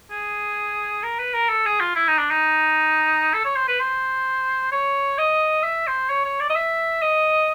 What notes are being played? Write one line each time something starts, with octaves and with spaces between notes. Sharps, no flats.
G#4
A#4
B4
A#4
A4
G#4
F4
E4
D#4
D4
D#4
A4
C#5
C5
B4
C5
C#5
D#5
E5
C5
C#5
C#5
D5
D#5
E5
D#5